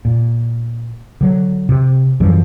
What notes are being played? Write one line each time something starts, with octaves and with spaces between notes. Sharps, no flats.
A#2
D3 F#3
C3
F#2 E3 F3 G3